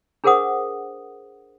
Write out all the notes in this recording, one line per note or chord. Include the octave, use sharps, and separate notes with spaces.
D4 G#4 A#4 C5 F#5 D#6